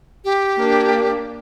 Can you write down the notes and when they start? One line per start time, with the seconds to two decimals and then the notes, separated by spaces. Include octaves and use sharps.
0.24 G4
0.58 A#3 D4